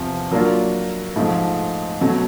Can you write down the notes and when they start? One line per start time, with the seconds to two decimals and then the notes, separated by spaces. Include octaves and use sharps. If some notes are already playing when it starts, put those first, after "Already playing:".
Already playing: E2 C3 F3
0.31 F#3 A#3 D4 F4
1.16 G#2 F3 A3
2.01 B2 F#3 A3 C#4